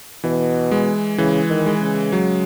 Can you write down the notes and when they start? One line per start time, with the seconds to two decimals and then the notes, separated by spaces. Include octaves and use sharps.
0.24 B2 E3
0.71 G#3
1.18 C#3 E3
1.50 D#3
1.66 G#3
1.82 C#3
2.12 F#3